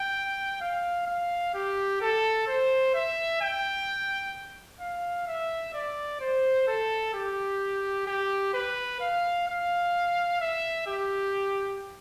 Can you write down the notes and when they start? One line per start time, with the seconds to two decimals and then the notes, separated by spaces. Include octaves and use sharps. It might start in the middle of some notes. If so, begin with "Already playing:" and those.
Already playing: G5
0.62 F5
1.07 F5
1.54 G4
2.01 A4
2.48 C5
2.94 E5
3.41 G5
4.81 F5
5.28 E5
5.74 D5
6.21 C5
6.68 A4
7.14 G4
8.07 G4
8.54 B4
9.01 F5
9.48 F5
10.41 E5
10.87 G4